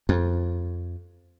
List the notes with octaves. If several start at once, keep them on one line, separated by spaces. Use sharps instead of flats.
F2